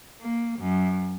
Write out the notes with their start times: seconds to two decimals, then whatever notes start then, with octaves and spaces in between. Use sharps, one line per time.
0.21 A#3
0.59 F#2